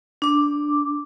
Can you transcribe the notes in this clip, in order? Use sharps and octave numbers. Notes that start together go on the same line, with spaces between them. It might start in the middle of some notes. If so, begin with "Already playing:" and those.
D4 D6